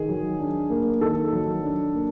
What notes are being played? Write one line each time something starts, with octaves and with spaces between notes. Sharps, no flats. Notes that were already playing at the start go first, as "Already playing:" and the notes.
Already playing: D#3 G#4
F#3
D4
A#3
D#3 A4
F#3
D4
A#3